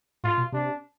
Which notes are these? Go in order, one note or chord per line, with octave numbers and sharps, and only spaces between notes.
A2 F4
B2
C3 D4